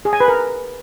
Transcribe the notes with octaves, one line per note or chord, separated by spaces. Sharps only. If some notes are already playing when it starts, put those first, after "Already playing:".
G#4
G#5
B4
A#4